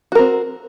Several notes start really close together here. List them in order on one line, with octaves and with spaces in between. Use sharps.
F#4 A#4 C4